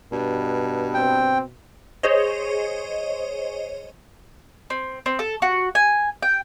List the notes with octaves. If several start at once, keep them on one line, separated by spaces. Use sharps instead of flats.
G2 B2
C4 G5
G#4 C5 C#5 D#5
C4
C4
A4
F#4
G#5
G5